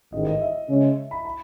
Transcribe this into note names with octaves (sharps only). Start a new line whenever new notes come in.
A1 G#2 D#3 D#5
D#5
E5
C#3 G#3 C#4
B5
B5